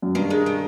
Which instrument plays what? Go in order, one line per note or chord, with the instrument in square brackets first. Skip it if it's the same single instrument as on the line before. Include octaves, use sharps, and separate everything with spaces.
[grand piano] F#2
[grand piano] G2 [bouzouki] D#3
[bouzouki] G#3
D#3